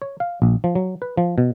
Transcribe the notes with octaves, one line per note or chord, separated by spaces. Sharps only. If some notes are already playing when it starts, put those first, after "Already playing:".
C#5
F5
A#1
F3
F#3
B4
F3
B2